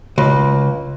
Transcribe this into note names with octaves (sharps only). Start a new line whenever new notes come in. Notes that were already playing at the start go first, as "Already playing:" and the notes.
C#2